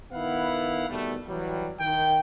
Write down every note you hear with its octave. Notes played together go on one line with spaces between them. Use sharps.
D#3 B3 E4 F5 F#5
B2 D#3 G3 A3
E3 F#3 G3
D#3 G5